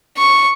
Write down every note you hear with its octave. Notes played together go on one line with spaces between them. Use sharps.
C#6